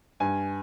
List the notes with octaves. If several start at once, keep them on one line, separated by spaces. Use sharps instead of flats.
G2 G#5